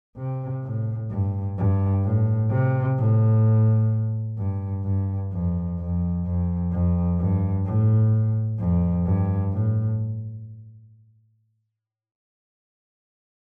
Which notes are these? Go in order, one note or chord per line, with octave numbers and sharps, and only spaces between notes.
C3
A2
G2
G2
A2
C3
A2
G2
G2
F2
F2
F2
F2
G2
A2
F2
G2
A2